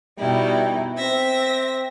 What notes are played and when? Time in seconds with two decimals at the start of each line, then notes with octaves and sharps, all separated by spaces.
0.18 B2 G3 D#4 E4
0.98 C4 E5 A#6